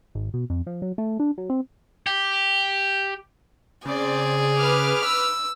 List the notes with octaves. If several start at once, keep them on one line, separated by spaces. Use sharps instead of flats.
G#1
B2
F2
F3
F#3
A3
D4
F#3
C4
G4
C#3 C4 G#4 D5
B4 D6 F6
E6